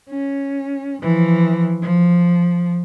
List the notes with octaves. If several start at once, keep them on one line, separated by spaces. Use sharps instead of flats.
C#4
E3 F3
F3